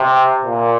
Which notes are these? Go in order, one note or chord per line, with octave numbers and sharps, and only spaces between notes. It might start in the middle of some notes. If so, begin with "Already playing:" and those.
Already playing: C3
A#2